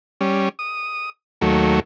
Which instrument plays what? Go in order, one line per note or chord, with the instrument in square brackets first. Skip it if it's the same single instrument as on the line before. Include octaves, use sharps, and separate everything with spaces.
[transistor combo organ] G3 C#4
D#6
D#2 F#3 A3